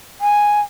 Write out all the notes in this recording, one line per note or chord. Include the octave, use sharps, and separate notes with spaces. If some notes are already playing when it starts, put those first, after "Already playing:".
G#5